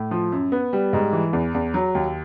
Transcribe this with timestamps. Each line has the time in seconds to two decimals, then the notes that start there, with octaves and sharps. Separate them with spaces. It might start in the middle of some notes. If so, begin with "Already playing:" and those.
Already playing: A2
0.11 F3
0.32 F#2
0.52 B3
0.73 G3
0.93 G#2
1.13 E3
1.33 E2
1.55 E2
1.74 F#3
1.95 D#2